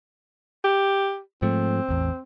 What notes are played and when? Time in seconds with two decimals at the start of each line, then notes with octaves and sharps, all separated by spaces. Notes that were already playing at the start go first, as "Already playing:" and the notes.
0.64 G4
1.42 G#2 F3 A3 C4
1.89 A1 E2